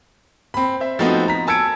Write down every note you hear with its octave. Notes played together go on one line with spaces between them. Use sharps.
C4 B5
C5 E5
F3 A3 B3 C4 D#4 F#4
A#5 B6
G#5 A5 E6 G#6 C#7 D7